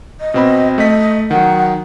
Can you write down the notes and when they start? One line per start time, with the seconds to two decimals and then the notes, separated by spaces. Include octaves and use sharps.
0.21 D#5
0.34 B2 C4 B5
0.78 A3 D#5 B6
1.31 D#3 F#3 F#5